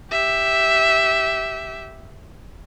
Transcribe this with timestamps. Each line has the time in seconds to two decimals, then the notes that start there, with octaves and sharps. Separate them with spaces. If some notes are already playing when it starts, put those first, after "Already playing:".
0.11 G4 E5